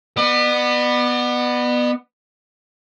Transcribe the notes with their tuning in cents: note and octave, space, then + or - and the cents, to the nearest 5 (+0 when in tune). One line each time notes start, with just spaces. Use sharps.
B3 +0 D5 +45